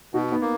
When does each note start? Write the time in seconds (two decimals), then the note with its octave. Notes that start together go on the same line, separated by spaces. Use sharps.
0.14 B2 D#4 F#4
0.32 B3 D#4
0.41 A#3